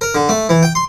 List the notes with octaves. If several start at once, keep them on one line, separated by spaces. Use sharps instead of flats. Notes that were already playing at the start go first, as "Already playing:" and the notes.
A#4
D3
A3
E3
G5
C6